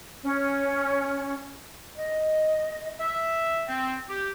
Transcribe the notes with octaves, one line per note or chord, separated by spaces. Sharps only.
C#4
D#5
E5
C4
G4